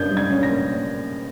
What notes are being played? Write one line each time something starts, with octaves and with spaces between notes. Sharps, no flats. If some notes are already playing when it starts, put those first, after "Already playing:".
Already playing: G2 A#3 C#4 G6 G#6
G3
G#6
C#4
A#6
A#3